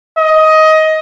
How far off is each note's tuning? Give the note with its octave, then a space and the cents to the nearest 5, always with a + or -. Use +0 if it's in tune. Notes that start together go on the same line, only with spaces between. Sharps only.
D#5 +15